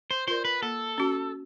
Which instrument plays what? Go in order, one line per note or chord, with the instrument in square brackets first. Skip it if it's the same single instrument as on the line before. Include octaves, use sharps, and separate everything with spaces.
[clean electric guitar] C5
[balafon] F4 A#4 D5 [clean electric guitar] C5
[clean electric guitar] B4
[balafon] A#3 [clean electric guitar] A4
[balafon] C#4 F#4